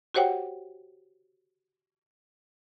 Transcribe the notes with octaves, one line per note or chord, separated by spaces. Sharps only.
F#4 G4 C5 C#5 F#5 G5